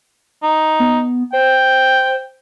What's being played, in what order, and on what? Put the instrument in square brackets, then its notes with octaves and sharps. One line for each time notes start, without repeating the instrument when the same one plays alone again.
[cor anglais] D#4
[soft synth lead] B3
[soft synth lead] C5 [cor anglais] G5